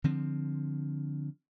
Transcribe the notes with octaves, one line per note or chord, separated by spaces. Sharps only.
D3 F3 C4